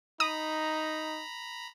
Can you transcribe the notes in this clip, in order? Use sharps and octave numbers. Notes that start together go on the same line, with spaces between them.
D#4 A#5 B5 D#6